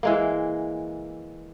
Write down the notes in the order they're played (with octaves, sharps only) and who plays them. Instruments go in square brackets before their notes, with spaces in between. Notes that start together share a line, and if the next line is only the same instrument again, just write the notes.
[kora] E3 G#3 A#3